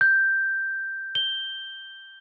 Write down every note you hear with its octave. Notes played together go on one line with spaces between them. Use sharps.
G6
G7